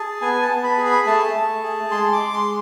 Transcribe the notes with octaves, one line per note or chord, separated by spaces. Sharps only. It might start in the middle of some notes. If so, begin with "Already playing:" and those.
Already playing: G#4 A5
B3 G#5
A5
B3
B5
G#4
B5
A3 A5
A3
G#4
G#3 C6
D6
G#3
C6